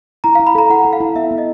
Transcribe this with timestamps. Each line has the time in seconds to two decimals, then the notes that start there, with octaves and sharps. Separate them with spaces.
0.24 E4 A#5
0.35 F5
0.39 E4
0.47 B5
0.55 A4 A#5
0.70 E4 F#5
0.85 A4
0.93 F5
1.00 E4
1.15 B3 E5
1.31 B3
1.38 D#5